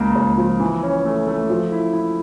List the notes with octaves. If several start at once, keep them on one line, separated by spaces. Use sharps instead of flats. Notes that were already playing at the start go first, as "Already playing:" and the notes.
Already playing: C#2 A#3
C#2
F3
E3
C#4
A3
A3
F3
E4
E4